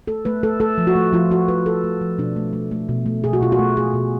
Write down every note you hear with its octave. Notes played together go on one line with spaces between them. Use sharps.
A3 A4
A3 B4
A3 A4
A3 A4
F3
F#4
A3
F3 F4
F3 F#4
F3 B4
A3 A4
A3
F3
B2 D4
A3
A3
A3
B2
A3
B2 G#4
F#4
B2 F4
F#4
A3
A3 G#4
B2